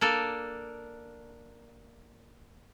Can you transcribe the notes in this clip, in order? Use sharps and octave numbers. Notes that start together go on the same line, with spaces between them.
A#3 D4 A4